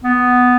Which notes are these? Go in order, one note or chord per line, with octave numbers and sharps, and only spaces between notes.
B3